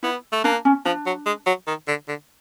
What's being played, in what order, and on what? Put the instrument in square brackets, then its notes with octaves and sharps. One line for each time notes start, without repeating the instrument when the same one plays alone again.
[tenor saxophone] B3 [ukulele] E4
[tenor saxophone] A3
[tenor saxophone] A#3 [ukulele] D4
[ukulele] C#4
[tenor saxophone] F3 [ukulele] D4
[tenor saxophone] F#3
G#3
F#3
D#3
D3
D3